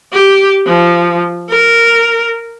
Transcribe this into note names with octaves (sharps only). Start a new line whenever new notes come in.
G4
F3
A#4